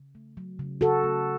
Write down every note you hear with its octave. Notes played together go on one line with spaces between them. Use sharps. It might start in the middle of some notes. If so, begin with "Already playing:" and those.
Already playing: C#3
A3
F#3
C#3
C#3 F#4 A4
A3